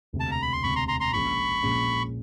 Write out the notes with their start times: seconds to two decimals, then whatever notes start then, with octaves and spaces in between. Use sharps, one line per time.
0.13 E1 D2 C3
0.20 A5
0.31 A#5
0.42 B5
0.52 C6
0.63 E1 D2 C3 B5 C#6
0.75 A#5 C6
0.88 A#5 C6
1.00 A#5 C6
1.13 A#1 A#2 F3 G#3 C#4 B5 C#6
1.63 A#1 A#2 F3 G#3 C#4